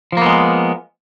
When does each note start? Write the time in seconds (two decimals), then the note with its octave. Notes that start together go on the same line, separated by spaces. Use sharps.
0.12 F3
0.17 A#3
0.22 B3
0.26 G#3